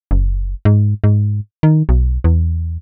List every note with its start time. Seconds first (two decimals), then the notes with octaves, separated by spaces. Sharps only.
0.11 F#1
0.65 G#2
1.04 G#2
1.63 D#3
1.89 B1
2.24 E2